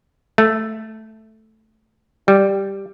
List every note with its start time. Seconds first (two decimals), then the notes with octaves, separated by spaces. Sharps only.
0.38 A3
2.28 G3